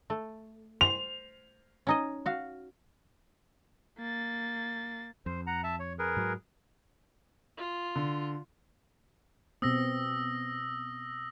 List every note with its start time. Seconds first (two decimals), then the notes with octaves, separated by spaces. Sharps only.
0.10 A3
0.81 C5 F7
1.87 C#4 D#4 D#5
2.26 F#4 F5
3.99 A#3 A6
5.26 F2 C5
5.47 F#5 A#5
5.64 E5 A5
5.80 C#5
5.99 G#4 A#4 B4
6.17 G#2 F#3
7.57 F4
7.96 D3
9.62 B2 B3 C4 D#6 E6 A#6